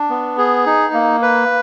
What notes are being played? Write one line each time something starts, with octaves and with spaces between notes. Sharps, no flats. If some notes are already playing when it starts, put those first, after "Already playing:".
Already playing: D4
B3
G#4
D#4
A#3
B4